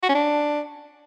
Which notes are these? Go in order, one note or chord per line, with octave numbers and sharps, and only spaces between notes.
F#4
C#4
D4